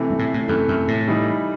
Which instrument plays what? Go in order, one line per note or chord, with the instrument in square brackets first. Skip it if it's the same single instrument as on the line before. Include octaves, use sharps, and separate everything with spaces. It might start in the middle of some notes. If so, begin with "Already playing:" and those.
Already playing: [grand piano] C3 E3 A3
[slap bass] G2
A2
A2
[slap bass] F#2 [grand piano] C3 E3 A3
[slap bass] F#2
A2
[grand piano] E3 G3 D#4